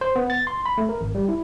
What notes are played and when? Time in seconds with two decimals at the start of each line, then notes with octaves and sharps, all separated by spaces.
0.01 C5
0.16 B3
0.30 A6
0.47 C6
0.66 B5
0.78 A3
0.89 A#4
1.01 G#1
1.15 G3
1.29 E4